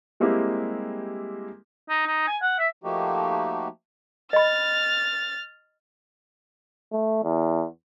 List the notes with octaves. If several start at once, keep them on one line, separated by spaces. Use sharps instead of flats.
G3 G#3 A#3 C4 E4 G4
D#4
D#4
G#5
F#5
E5
F3 A3 A#3 D#4 F#4 G4
D#5 B5 F6 A6
A3
E2